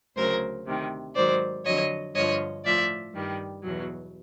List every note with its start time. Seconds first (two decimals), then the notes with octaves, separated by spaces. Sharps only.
0.16 D2 C#3 F#3 A#4 C5
0.65 D2 C3 D#3
1.15 G#2 D#3 F#3 C5 D5
1.65 F2 D3 F#3 C#5 D#5
2.15 G2 D3 F3 C#5 D#5
2.64 A2 F3 D5 E5
3.14 G2 D#3 G3
3.63 E2 B2 F#3